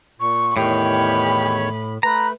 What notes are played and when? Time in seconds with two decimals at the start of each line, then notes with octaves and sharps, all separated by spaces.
0.20 A#2 C#6
0.57 E2 A2 D#3 G4 C#5 B5
2.03 A3 B4 A#5